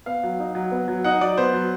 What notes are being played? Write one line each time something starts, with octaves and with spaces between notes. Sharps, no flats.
B3 F5
F#3
D#4
F#3
B3
F#3
D#4 F#5
F#3 D5
B3 C5
F#3